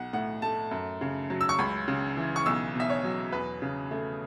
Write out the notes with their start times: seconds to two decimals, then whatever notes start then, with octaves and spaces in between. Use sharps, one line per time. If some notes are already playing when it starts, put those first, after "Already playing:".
Already playing: B1 F#5
0.13 A2 F#5
0.42 A3 A5
0.71 F#2
1.01 C#3
1.30 F#3
1.41 E6
1.49 C#6
1.59 C#2 B5
1.88 C#3
2.17 E3
2.36 C#6
2.46 B1 E6
2.75 B2 E5
2.90 C#5
3.04 F#3
3.32 E2 B4
3.62 C#3
3.91 A3